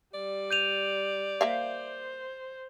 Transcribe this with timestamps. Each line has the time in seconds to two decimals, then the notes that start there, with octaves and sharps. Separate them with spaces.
0.14 G3 D5
0.51 G6 D#7 F7
1.41 A#3 C5 E5 F5